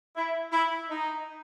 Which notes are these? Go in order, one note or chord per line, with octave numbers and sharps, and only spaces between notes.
E4
E4
D#4